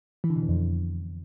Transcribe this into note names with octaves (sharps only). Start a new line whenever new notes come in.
E3
D3
B2
E2
F2